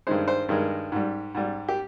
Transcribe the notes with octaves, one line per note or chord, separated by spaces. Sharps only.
G2 D#3 G#3 C5
C5
G2 D#3 G#3 A#4
G#2 G3
G#2 G3
G4